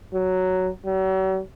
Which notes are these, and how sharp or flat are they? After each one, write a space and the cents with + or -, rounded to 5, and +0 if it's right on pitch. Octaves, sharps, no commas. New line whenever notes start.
F#3 +5
F#3 +45